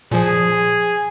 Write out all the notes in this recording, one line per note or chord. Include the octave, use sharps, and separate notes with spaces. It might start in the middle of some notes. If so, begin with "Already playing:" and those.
A#2 F3 G#4